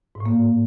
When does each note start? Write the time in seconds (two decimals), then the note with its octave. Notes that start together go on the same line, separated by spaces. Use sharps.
0.15 G#2
0.20 A2
0.26 A#3